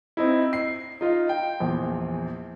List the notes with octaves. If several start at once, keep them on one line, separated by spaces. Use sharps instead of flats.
C4 D#4 E4
C7
D#4 F4 D#5
G5
A#1 E2